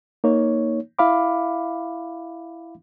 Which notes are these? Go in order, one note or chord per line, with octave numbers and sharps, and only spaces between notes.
A#3 D#4 C#5
E4 E5 F5 B5 D6